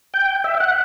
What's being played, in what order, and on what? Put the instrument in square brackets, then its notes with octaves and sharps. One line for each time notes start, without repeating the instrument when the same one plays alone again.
[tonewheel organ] G5
E5
F#5